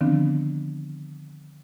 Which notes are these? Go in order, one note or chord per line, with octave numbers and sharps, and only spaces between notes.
D3 D#3 F3 B3 C4 D4